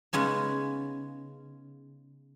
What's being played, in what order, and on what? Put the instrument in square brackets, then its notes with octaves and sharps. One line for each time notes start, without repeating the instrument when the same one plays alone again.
[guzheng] C#3 G#3 B3 C#4 D#4